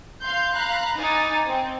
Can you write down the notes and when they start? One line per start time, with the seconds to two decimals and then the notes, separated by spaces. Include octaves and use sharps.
0.23 F5 C6 G6
0.54 F5 A#5 B5 F#6
0.97 D#4 G#5 D6 A6
1.46 C4